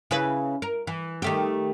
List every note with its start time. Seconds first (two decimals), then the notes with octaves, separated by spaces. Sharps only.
0.11 C#3 E4 B4
0.62 A#4
0.87 E3
1.22 D#3 A3 G4